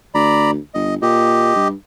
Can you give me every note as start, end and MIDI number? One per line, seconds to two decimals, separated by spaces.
0.15 0.57 38
0.15 0.51 74
0.15 0.51 82
0.15 0.51 83
0.74 0.97 31
0.74 0.95 75
1.02 1.52 46
1.02 1.68 67
1.02 1.68 75
1.56 1.73 43